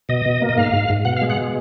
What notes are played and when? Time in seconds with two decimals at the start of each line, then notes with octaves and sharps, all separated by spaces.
0.09 B2 D#5
0.26 B2
0.42 A#3
0.49 D#5
0.57 G#2 F5
0.73 G#2
0.90 G#2
1.05 B2 F#5
1.17 F5
1.21 G#3
1.30 F#5
1.37 B2